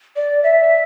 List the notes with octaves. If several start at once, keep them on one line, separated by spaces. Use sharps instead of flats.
D5
E5